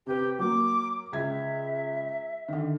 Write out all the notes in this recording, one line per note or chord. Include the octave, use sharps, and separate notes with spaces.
C3 G4 B4
F#3 A#3 D6
C#2 E5 G#6
D3 D#3